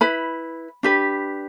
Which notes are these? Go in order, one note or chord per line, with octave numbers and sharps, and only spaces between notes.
E4 B4 B5
D4 G4 B4